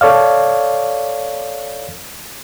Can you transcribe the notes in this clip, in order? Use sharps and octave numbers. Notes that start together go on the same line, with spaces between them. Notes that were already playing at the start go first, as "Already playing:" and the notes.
A4 C#5 D5 F5